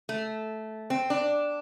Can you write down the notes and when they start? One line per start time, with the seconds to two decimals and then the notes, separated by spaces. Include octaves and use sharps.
0.09 A3
0.90 C4
1.10 D4